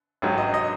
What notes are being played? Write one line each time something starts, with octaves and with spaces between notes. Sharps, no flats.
A1 G#2 F#3
D#5
D#5